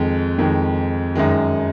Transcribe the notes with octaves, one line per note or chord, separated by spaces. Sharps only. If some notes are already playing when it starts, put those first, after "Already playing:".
Already playing: F2 D#3 G#3
F2 D#3 G#3
F#2 D#3 G#3